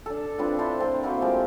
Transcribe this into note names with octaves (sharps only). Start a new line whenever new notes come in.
D4 A4
C4 D4 F4 B4
E4 C5 A5 C6
A3 A#3 C4
A#3 C4 E4 F#4
F3 G#3 G4